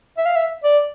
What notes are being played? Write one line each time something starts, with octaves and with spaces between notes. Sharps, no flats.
E5
F5
E5
D5